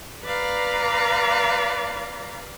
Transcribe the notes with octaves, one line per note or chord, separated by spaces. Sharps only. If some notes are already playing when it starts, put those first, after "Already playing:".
B4 D5 F5 A#5